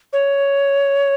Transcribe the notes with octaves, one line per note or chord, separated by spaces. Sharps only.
C#5